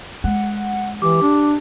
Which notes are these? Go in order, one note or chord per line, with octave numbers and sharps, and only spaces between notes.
G#3 F#5
E3 G4 D6
D4